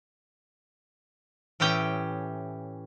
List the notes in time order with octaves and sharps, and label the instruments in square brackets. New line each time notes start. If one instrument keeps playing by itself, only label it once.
[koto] A2 E3 C#4 G4 G5